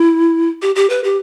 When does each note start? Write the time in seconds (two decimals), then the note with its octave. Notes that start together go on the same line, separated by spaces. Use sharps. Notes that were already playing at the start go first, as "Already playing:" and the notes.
Already playing: E4
0.62 G4
0.76 G4
0.90 B4
1.04 G4